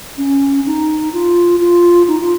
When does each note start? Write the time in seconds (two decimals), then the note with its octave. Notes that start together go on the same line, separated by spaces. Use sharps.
0.18 C#4
0.66 D#4
1.13 F4
1.60 F4
2.08 D#4
2.20 F4